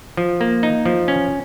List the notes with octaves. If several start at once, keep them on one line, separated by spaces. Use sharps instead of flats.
F3
A#3
D#4
F3
C#4